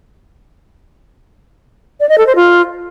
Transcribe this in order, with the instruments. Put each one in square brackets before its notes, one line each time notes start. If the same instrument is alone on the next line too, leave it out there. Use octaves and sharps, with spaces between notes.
[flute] D5
D#5
A4
C5
F4